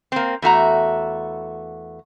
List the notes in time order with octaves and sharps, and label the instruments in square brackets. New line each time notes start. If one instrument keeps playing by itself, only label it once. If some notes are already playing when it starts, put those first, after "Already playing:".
[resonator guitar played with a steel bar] A#3 C4
E2 A3 F#4 A#5